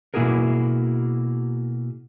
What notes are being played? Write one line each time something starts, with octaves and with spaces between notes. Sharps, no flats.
B2 A#3 E4 F#4 G#4 A#4